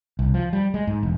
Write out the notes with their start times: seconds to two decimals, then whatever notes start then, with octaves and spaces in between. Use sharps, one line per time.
0.19 C2
0.34 F3
0.53 G3
0.74 G#3
0.87 G#2
1.03 E1